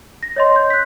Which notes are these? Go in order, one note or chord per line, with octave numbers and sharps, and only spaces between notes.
A#6
C#5 D#5 C6
G6
F#6 B6